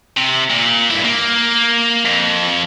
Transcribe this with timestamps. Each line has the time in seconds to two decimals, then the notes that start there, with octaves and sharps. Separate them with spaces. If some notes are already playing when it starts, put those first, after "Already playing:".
0.17 C3
0.50 A#2
0.91 G2 E4
1.04 A#3
2.06 F2